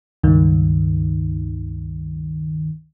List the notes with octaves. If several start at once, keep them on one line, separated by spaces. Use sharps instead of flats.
C#2 G2 D#3